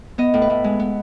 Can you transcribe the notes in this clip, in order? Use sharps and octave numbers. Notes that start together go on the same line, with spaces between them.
B3 D#5
A2
B4
A2
G#3
B3